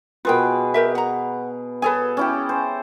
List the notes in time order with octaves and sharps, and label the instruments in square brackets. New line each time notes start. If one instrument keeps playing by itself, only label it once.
[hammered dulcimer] B2 G#4 B4 [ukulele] F4 A#4 G5
[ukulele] G4 A#4 E5
F#5 A#5
[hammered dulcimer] G#4 A4 [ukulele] B4 C#5 G#5
[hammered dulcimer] C#4 E4 G4
C5